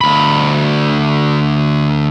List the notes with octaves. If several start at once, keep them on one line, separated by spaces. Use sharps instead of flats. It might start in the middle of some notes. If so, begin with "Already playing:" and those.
D2 B5